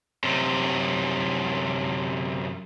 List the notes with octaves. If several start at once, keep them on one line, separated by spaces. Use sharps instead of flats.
F#2 C3